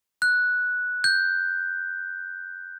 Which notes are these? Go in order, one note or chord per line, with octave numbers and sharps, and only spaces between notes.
F#6
G6